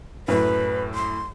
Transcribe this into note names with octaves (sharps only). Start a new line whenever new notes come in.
F#2 A2 B4
C6